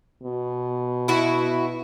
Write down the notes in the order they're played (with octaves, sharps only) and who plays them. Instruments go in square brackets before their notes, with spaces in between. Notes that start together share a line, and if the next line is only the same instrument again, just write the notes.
[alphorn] B2
[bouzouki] E4 F#4